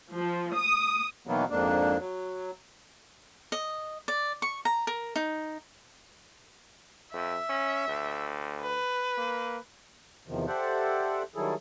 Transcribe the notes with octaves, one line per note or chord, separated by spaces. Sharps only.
F3
D#6
B2 D#3 E3 F#3 A#3 B3
F2 G#2 A#3 D4
F#3
D#5
D5
C#6
A#5
A#4
D#4
F2 E5
C#4
D2
B4
A#3
E2 C3 D#3 F3
G4 A4 C5 D5 E5 F#5
D#3 F#3 G3 E4 G#4 A4